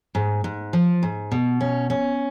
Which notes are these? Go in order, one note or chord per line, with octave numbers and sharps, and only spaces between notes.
G#2
G#2
F3
G#2
B2
C#4
C#4